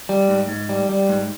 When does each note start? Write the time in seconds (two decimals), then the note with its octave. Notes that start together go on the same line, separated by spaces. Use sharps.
0.09 G3
0.29 G#2
0.49 G#2
0.69 G3
0.89 G3
1.09 G#2